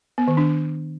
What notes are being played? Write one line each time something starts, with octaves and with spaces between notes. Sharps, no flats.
B3
D#3
D4